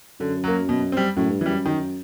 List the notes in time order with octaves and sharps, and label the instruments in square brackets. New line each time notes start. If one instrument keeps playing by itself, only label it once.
[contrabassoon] F#2 [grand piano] D3
[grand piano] F#3 A#3
B2
G3 C4
[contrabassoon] F#2 [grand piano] A2
[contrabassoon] G2
[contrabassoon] F#2 [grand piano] E3 G3
[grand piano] D#3